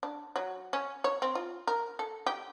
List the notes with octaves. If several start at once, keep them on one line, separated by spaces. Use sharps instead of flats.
D4
F#3
C#4
C#5
C4
F4
A#4
A4
G4